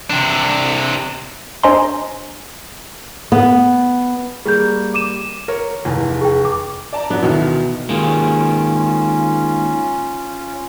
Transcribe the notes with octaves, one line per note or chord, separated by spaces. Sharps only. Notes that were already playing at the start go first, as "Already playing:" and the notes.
C3 D4
D4 C5 D#5 G#5 A#5 C6
B3
G3 A#3 G#4 G6
D6 D#7 E7
A#4 C#5
F1 E2 G#5
G#4 G5
D6
D5 A5 A#5
F#3 B3 D4
D2 B2 D#3 E3
D#3 G#3 A#3 C#4 F4